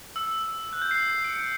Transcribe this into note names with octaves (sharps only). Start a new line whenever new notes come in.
E6
F#6
G6
C7
D7
C#7